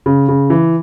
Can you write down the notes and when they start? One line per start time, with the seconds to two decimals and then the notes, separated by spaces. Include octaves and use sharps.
0.06 C#3
0.29 C#3
0.50 E3